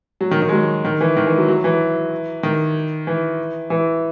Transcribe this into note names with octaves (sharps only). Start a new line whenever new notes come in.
F#3
D#3
D#3
G#3
F#3
D#3
E3
D#3
E3
F#3
F#3
E3
D#3
E3
E3